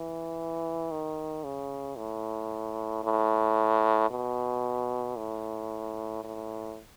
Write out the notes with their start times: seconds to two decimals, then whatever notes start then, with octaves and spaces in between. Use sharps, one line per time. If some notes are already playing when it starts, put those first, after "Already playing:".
Already playing: E3
0.91 D#3
1.44 C#3
1.97 A2
3.04 A2
4.11 B2
5.17 A2
6.24 A2